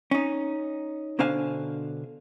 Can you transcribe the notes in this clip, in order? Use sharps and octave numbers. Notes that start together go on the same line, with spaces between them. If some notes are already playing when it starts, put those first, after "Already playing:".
C#4 D#4
B2 D3 D4 C5 F5 G#5